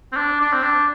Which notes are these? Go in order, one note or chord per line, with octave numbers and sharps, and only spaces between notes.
C4
D4
D4
C4
D4